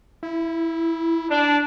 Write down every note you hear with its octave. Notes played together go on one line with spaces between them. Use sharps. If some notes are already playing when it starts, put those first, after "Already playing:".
E4
D4